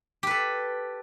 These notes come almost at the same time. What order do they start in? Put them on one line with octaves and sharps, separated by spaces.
G4 B4 A4